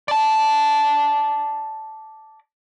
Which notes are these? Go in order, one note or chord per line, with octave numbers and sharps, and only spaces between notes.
D5 A5